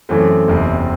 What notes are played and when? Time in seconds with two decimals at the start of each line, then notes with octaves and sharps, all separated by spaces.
0.09 F#2 E3 A3 C4
0.48 F#1 E2 C3 E3 C4